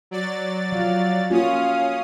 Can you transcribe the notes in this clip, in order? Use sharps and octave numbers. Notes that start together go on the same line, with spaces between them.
F#3 D5 A6
F3 F5
A#3 C#4 F4 F#4 F5 D#6